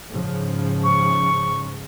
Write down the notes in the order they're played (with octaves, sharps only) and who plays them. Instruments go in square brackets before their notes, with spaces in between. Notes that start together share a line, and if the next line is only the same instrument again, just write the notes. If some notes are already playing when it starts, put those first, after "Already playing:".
[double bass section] G#2 C#3 F3
[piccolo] C#6